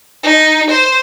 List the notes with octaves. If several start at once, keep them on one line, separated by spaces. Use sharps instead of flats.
D#4
C5